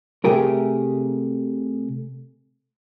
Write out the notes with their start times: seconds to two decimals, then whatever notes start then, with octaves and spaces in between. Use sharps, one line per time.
0.25 C3 A3 G4 G#4 A#4